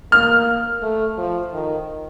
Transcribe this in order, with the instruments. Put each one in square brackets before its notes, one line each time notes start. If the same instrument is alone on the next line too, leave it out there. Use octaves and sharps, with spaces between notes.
[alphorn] A#3 [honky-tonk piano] F6
[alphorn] A3
F3
D#3